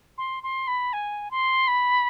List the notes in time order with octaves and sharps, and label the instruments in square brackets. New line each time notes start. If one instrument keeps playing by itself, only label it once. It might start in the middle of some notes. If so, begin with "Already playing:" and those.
[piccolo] C6
C6
B5
G#5
C6
B5